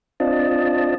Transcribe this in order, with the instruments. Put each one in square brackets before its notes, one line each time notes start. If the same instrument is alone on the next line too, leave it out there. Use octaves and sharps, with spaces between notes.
[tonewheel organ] C4 D4 F4 D#5 A5